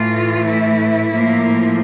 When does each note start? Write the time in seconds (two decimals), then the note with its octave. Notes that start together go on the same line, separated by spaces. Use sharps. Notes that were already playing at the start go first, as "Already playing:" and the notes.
Already playing: A2 E3 A3 F4
0.47 E4
1.11 A2 F3 A#3